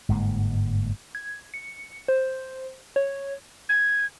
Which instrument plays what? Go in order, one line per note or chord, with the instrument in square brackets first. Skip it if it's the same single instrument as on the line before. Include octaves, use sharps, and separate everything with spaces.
[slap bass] G1 G#2 G#3 A#3
[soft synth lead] G#6
C#7
C5
C#5
[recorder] G#6